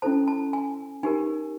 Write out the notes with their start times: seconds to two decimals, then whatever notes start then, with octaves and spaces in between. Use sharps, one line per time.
0.02 C#4 E4 A4 C5 A5
0.28 A5
0.53 G#5
1.03 D#4 G4 A#4 G#5